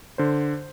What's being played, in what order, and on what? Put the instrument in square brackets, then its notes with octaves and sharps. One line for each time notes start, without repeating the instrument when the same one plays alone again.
[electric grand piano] D3 C5